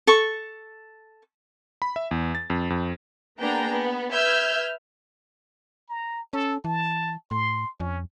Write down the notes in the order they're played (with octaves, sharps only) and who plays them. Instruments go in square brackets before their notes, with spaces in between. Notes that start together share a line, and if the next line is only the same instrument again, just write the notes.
[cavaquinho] A4 C#6
[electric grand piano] B5
E5
E2
A6
F2
F2
[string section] A#3 B3 D4 G#4 G5 A#5
B3
B4 E5 E6 F6 G6 G#6
[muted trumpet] A#5
[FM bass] C#4 [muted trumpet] A4
[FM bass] E3 [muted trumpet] A5
[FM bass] A2 [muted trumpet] C6
[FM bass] F2 [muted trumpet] C#4